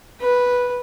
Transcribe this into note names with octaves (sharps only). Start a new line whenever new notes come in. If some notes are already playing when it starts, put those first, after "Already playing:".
B4